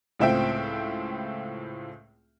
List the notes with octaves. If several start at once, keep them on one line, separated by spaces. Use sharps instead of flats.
C#2 A2 C4 F4 E5 G5